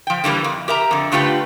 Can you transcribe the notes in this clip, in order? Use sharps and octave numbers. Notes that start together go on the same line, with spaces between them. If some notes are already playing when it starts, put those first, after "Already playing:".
F3 G5
D3 E3 G3 A#3
F2
G4 A#4 E5 A#5
F2 D3
D3 A3 F4 G4 B4